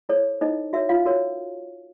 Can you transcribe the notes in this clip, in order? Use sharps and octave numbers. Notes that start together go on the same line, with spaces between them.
E4 A4 C5 C#5
D#4 E4 A4 C5 D#5
E4 F#4 A#4 C#5 E5
F4 F5
F#4 A#4 C#5